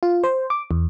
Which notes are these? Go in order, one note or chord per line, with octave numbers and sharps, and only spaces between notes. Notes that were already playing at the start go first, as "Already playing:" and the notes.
F4
C5
D6
E2